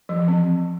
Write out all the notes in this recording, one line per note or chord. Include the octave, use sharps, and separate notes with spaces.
F3
E3
C4